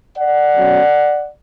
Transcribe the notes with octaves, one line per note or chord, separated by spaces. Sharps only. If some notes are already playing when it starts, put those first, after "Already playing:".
D5 F#5
B2 F#3 C#4